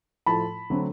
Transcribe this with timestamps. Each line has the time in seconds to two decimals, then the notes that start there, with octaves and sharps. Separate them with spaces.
0.26 A2 F3 A3 A5 B5
0.70 D3 F#3 A3 C4